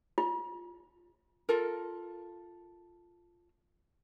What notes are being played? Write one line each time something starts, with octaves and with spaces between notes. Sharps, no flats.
F4
F4 A4 A#4